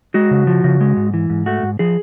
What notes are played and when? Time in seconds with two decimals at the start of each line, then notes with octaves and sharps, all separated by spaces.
0.14 G#3 F#4
0.31 C#3
0.47 F3
0.64 C#3
0.81 G#3
0.97 G#2
1.14 E3
1.30 G#2
1.46 A3 F#4
1.63 G#2
1.79 F3 G#4